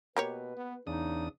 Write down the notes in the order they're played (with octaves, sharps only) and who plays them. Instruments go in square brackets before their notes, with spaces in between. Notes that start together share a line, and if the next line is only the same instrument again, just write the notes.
[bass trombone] B2 [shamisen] A#3 G4 C#5 [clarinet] B4
[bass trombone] B3
[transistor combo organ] E2 D4 D#6 [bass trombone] C#3 [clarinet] D#4